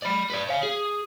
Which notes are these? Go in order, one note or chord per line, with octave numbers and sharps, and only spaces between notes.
D5 B5
B4 D5
C#5 F5
G#4